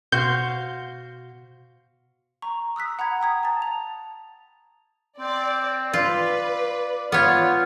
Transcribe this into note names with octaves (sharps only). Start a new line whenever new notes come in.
B2 F#4 C5 F5 G6
A#5 C#6
D#6 E6 F#6 B6
F#5 A#5 B5 G#6
G5 A#5 D#6 G#6
A5 A#5 A6
F7
C4 D5
F4 B4 D5
B3 F4 C#5